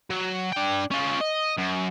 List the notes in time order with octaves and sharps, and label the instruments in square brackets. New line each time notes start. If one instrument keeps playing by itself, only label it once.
[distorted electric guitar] F#3
D4 G5
C#4 F4
D#5
F#2